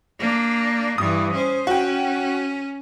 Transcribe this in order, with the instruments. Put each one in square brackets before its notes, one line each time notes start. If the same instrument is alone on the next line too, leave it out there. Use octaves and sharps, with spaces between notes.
[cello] A#3 D4
[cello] G2 E3 [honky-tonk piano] D#6
[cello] C#4 C5
[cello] C#4 [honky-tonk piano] F#4 G5